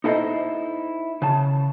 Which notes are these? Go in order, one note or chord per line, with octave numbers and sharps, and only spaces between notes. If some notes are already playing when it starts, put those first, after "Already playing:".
D#4 E4 A4 B4 C5 D#5
C#3 A5